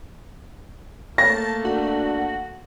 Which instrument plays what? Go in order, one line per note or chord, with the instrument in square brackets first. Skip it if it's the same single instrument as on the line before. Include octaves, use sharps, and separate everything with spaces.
[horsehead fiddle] A3 A#3 [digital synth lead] A5 [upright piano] A#6
[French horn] D4 [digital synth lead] F#4